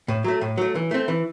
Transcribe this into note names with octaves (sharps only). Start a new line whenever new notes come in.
A2
F#3 A3
A2
F#3 A3
E3
A3 C4
E3